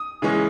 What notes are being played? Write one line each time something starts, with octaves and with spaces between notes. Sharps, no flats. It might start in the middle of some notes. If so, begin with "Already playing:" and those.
Already playing: D#6
C#3 E3 G#3 C#4